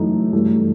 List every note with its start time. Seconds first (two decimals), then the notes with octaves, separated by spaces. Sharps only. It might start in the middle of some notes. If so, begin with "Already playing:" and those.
Already playing: F#2 E3 A3 D#4
0.33 G2 E3 A3